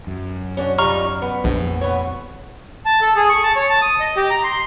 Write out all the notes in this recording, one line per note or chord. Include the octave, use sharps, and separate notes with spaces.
F#2
C#4 D4 F#4
G3 D#4 F4 A#5 C#6 F6
B3
A#1 F2 A#2 F3
B3 C#5
A5
A4
G#4
C#6
A5
C#5
A5
D#6
D#5
G4
A#5
C6